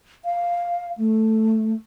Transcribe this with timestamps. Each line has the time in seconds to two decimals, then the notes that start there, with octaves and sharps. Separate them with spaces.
0.25 F5
0.98 A3